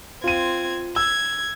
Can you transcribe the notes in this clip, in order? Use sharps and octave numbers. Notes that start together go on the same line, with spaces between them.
C4 F4 G#6 D#7
E6 G#6